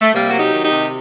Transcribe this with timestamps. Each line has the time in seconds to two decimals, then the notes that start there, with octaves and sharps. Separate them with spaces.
0.02 A3
0.14 C3 G3 A#3
0.29 F#3 F#4
0.39 D#4 G4
0.52 D#3
0.65 D#4 G4
0.71 C3